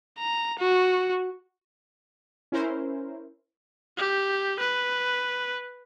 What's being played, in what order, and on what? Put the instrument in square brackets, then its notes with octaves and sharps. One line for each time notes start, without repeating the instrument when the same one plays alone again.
[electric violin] A#5
F#4
[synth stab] C#4 E4 A#4 C5
[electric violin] G4
B4